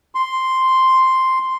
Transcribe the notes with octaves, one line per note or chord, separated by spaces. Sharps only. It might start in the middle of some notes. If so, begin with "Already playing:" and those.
C6